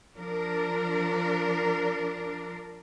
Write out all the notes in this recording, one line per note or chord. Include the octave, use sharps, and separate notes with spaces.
F3 D4 A#4